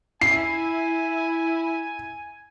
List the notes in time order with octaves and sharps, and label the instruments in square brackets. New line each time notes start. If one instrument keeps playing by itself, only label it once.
[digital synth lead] E4 [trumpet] G#5 [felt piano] C7